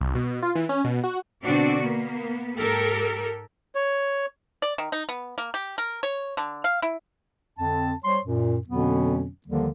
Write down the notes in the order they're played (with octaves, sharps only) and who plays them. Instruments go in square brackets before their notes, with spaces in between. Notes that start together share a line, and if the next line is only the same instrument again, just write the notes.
[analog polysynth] C2
B2
F4
E3
C#4
B2
F#4
[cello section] B2 D3 C4 D4 F#4 D5
A#3 B3
G#2 G4 A4 A#4
[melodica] C#5
[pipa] D5
D#3
D#4
B3
A#3
G4
A#4
C#5
D3
F5
E4
[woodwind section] F2 D3 C4 A5
G3 C5 C#5 C6
F#2 A#2
F2 B2 D3 F#3 B3 C#4
D#2 D3 D#3 F3 G3 A#3